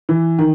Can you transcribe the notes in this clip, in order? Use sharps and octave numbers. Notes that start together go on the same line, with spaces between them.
E3
D#3